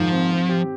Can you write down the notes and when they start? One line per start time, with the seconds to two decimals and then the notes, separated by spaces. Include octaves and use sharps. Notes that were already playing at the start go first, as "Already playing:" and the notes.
Already playing: G#2 D#3 F3
0.12 C4
0.31 C4
0.49 G4